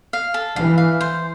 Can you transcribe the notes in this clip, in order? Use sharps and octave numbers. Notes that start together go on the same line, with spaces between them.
F5
A4
E3 F5
F5
C5